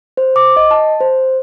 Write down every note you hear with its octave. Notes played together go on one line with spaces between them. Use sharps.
C5
D6
D#5
A5
C5